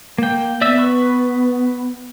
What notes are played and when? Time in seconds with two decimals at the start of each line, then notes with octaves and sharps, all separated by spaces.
0.18 A#3 G5
0.61 B3 D5 E5 E6
0.78 B4 C#6